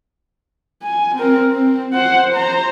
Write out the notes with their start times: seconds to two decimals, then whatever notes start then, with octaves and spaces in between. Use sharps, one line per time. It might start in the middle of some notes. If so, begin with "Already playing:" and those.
0.82 G#5
1.15 C4 A#4
1.52 C4
1.94 C5 F#5
2.33 C5 A#5